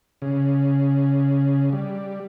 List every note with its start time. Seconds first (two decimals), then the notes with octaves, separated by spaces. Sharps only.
0.22 C#3
1.73 G3